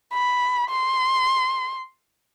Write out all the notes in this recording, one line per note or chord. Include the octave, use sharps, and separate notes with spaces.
B5
C6